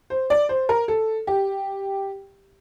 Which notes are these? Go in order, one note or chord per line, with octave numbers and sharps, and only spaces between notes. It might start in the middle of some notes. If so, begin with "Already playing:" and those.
C5
D5
C5
A#4
A4
G4